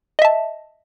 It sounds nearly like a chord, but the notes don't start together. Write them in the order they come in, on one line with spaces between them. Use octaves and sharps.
D#5 E5 A5